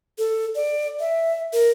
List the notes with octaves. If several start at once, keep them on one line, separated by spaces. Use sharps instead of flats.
A4
D5
E5
A#4